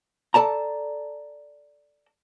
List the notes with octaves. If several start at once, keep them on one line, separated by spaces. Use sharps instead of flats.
A4 D5 A5 A#5